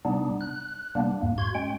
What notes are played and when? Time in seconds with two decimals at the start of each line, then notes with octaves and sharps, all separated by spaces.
0.05 C3 G3 B3 D4 D#4
0.41 F#6
0.95 C3 G3 A#3 B3 D4
1.21 E2 G#2 A#3
1.38 G#2 F#4 C6 G#6
1.55 G#3 C#4 G5